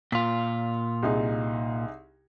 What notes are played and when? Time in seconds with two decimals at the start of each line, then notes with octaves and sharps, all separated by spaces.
0.12 A#2 F4 B6
1.03 C2 D#4 G#4